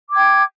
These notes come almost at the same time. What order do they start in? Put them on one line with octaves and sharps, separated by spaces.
D6 G#6 G5